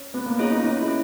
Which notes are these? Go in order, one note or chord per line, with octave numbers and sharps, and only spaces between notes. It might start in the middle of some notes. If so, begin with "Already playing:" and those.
Already playing: C#4
A3 B3
A#3
C#4 D#4 F4 G#4 C#5
D#4
A3 D#4
E4
C#4